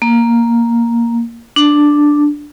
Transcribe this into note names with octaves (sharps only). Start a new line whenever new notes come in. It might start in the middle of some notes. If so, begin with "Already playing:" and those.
A#3
D4